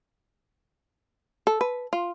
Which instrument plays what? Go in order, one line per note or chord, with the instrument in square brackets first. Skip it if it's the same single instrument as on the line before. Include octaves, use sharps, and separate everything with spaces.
[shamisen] A4
B4
F4